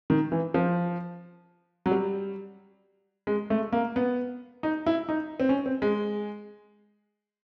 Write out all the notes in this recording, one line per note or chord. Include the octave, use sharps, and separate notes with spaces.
D#3
E3
F3
F#3
G3
G#3
A3
A#3
B3
D#4
E4
D#4
C4
C#4
C4
G#3